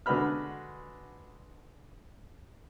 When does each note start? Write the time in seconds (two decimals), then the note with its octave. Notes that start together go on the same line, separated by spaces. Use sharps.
0.06 D3 G#3 F#4 B4 B5 F6